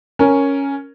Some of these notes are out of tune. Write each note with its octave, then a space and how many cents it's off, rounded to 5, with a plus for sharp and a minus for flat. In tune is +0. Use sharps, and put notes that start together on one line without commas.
C#4 +0 A#4 +0